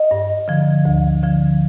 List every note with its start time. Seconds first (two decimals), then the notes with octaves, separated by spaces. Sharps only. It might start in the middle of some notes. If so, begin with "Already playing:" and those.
Already playing: D#5
0.11 G2
0.48 D3 F3
0.85 D2
1.23 D3 F3